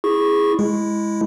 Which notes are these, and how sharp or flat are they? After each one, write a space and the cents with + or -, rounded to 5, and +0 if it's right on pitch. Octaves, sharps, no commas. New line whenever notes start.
E4 +0 G#4 -10 C#6 -15
G#3 +0 E4 +0